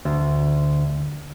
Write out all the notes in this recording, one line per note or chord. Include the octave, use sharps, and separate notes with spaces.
D2